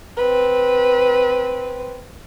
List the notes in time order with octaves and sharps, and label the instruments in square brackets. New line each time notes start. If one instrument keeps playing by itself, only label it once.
[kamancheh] C4 B4